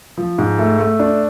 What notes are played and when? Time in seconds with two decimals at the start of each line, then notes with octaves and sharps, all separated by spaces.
0.18 F3
0.38 G#2
0.59 A3
0.79 A3
1.00 D4